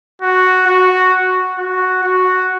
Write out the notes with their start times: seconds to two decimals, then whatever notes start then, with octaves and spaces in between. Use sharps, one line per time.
0.21 F#4
0.67 F#4
1.58 F#4
2.04 F#4